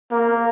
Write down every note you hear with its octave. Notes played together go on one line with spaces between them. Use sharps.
A#3